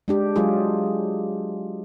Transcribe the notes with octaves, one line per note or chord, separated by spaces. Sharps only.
G#3 D4 G4
F#3 G#3 F4 G#4